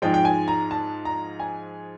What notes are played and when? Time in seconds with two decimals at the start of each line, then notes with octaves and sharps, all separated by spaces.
0.02 G#2 F3 G#3 G5
0.14 G5
0.25 G#5
0.48 A#5
0.71 A5
1.05 A#5
1.40 G#5